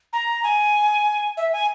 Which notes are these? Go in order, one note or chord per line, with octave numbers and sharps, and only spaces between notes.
A#5
G#5
E5
G#5